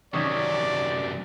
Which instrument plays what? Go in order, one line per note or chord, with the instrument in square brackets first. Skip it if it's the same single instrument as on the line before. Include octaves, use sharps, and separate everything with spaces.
[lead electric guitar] F#2 C3 [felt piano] D#3 C#4 [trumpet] D5 [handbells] C#6 D#6 G#6